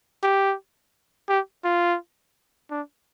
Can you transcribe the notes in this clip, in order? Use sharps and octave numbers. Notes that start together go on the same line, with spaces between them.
G4
G4
F4
D4